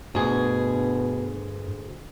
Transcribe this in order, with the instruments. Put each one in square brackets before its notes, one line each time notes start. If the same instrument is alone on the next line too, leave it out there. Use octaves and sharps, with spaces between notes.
[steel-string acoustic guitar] D2 G#4 [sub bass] G2 [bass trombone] B2